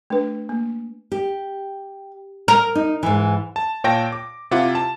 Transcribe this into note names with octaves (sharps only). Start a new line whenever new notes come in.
A3 D4 B4
A#3
G4
A#4
D#4
G#2 E3
A5
A#2 C#5 F5 G5 A5 A#6
D6
C3 E4 F4 F#5 D6
A5